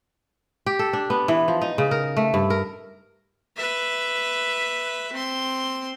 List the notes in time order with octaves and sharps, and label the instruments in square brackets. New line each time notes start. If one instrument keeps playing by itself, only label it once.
[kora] G4
A4
D4
B3
E3
F3
D#4
C#3
A#4
A3
G2
A#4
[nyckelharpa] B4 E5
C4 C6